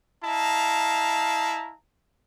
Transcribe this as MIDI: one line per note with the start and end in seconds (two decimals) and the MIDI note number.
0.24 1.75 64
0.24 1.75 75
0.24 1.75 77
0.24 1.75 81
0.24 1.75 82